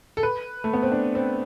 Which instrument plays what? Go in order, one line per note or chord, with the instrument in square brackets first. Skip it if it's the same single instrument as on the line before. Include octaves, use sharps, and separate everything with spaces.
[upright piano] A4
B4
A3
B3
C4
D4
C4